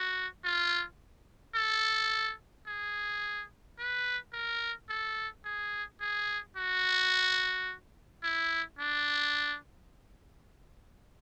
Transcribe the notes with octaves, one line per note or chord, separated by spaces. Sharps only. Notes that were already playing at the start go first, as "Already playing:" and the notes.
Already playing: F#4
F4
A4
G#4
B4
A#4
A4
G#4
G#4
F#4
E4
D4